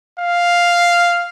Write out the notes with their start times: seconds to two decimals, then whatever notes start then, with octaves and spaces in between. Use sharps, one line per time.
0.20 F5